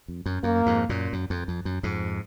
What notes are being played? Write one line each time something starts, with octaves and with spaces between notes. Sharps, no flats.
F2
F#2
F#2 A#3
F2 G#2
F#2 A#2
F#2
F2
F2
F#2
F2 G#2